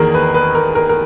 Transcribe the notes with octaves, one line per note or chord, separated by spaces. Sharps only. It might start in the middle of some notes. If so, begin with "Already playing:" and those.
Already playing: E2 D#3 A#3 G#4 A#4
B4
B4
A#4
A#4
A#4